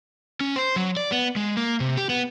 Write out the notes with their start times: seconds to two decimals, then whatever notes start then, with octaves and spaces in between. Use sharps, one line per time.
0.41 C#4
0.56 C5
0.76 F#3
0.97 D5
1.12 B3
1.36 G#3
1.57 A#3
1.80 C3
1.97 G4
2.10 B3